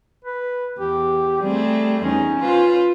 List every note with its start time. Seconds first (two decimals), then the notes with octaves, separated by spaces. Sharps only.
0.25 B4
0.79 E2 G4
1.42 G3 A3 C4 G#4
2.04 E2 C#4 D#4
2.41 F4 B4 C5